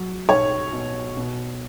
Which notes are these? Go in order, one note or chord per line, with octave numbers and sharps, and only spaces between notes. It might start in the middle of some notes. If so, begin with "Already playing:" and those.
Already playing: F#3
B1 C#5
B2
B2